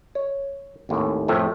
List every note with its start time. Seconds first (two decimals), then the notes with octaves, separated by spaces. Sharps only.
0.15 C#5
0.89 G#1 D#2 A2
1.28 F2 A2 A3 C4